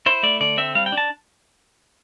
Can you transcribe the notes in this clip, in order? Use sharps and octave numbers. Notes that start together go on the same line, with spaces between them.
E4 C5
A3 D5
D3 D5
C4 E5
G3 F5
G5
D4
A5